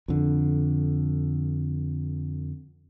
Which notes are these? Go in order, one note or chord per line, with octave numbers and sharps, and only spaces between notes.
F2 D3